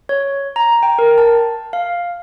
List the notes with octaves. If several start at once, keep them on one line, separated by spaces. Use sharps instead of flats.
C#5
A#5
G5
A#4
A5
F5